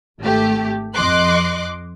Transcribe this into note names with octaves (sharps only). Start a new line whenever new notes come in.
G#1 A3 G4
F2 D#5 C6 D6 F#6